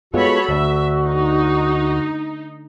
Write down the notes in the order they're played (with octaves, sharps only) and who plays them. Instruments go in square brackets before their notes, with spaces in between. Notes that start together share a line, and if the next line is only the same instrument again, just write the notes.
[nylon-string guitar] G#3 B3 F4 [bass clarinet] F#4 [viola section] A4 C#5 B5
[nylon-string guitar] D2 [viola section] E5
[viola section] D#4